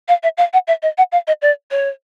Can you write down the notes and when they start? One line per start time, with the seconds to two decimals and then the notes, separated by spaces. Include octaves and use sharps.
0.08 F5
0.23 E5
0.37 F5
0.53 F#5
0.67 E5
0.83 D#5
0.98 F#5
1.12 F5
1.27 D#5
1.42 D5
1.71 C#5